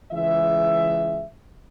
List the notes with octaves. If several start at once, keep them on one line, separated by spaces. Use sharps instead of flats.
C#2 E3 G#3 E5